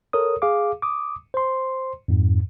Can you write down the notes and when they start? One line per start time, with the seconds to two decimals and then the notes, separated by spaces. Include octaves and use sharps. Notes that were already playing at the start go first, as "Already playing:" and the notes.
0.13 A4 A#4 C#5 D#6
0.42 G#4 F5 D6
0.82 D6 D#6
1.34 C5 C6
2.08 F2 G#2